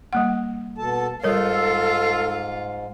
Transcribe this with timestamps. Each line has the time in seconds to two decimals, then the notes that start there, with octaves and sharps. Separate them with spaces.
0.13 G3 A#3 F#5
0.78 B2 A4 A5
1.23 G#2 G3 F4 A4 A#4 C#5